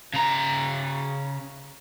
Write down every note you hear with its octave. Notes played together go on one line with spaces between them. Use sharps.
C#3 A#5